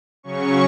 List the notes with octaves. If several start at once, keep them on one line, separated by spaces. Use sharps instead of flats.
C#3 F#3 C#4 C#6